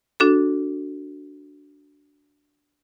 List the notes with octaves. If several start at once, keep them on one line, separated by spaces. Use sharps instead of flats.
D4 F#4 A4